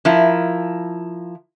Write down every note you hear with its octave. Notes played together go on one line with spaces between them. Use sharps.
F3 E4 A#4